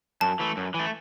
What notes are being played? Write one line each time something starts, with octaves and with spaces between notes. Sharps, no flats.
F#2 A5
E3 A3
F#2
E3 A3